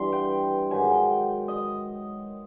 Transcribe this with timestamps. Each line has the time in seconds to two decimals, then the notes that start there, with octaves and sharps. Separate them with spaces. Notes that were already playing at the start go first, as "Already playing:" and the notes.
Already playing: G2 E3 G3 C6
0.12 G5
0.70 G#2 D#3 F#3 G#5
0.90 G5
1.48 D#5